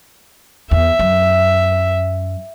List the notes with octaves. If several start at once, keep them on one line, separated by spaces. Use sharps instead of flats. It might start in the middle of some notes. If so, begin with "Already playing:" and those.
E2 E5
F#2